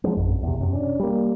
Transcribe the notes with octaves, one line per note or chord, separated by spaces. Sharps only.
F3 F#3 G#3 A#3
A#1 F#2
E2 C3
F#2 C3
C#4 D4
G3 A#3